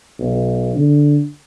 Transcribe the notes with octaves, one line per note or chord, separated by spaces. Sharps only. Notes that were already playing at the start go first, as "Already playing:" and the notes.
B1
D3